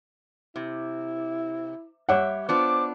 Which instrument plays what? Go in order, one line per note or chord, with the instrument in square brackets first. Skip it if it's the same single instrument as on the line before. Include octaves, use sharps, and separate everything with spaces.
[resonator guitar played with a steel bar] C3 [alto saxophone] E4
[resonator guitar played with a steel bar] G3 G4 E5 [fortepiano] C#5 F#5
[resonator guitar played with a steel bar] B3 D4 F4 [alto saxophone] C5 [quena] D6